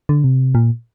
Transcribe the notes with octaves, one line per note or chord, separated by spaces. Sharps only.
D3
C3
A#2